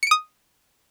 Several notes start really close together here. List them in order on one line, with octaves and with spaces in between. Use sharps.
C#7 D7 D#6